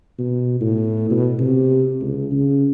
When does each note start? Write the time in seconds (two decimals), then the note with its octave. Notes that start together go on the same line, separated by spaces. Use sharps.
0.18 B2
0.61 A2
1.10 B2
1.39 C3
2.01 C#2
2.31 C#3